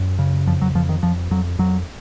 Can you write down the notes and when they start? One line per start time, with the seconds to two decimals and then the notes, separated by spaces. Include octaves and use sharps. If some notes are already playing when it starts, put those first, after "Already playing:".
Already playing: F#2
0.19 C#3
0.47 F2 F3
0.62 F#3
0.75 F2 F3
0.89 D#3
1.03 F2 F3
1.31 F2 F#3
1.59 F2 F#3